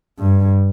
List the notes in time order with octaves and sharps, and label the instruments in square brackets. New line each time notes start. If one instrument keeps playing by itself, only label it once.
[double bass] G2